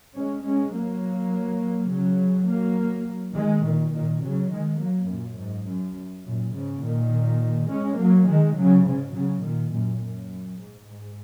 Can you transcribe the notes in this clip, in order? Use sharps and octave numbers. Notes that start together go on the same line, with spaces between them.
G#3 C#4
G#3 C#4
F#3 A#3
C#3 F#3
F#3 A#3
D#3 G#3
A#2 D#3
A#2 D#3
C#3 F#3
D#3 G#3
F#3 A#3
F#2 A#2
G#2
F#2
F#2 A#2
G#2 C#3
A#2 D#3
G#3 C#4
F#3 A#3
D#3 G#3
C#3 F#3
G#2 C#3
C#3 F#3
A#2 D#3
F#2 A#2
F#2
G#2
G#2